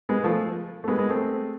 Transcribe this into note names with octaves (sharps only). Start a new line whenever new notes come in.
G#3 B3
F3 A3
A3
G#3 B3
G#3 B3
A3 C4